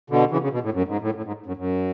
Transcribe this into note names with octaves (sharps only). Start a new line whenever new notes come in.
B2 D3
C#3 E3
C#3
B2
A2
F#2
G#2
A2
A2
G#2
F#2
F#2